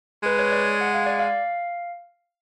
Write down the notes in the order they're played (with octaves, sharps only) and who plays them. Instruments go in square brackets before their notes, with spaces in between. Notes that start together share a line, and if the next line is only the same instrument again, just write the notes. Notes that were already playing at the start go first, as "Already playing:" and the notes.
[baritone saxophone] G#3 [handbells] B4
[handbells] C#5
D5
F#5
F5
D5
F5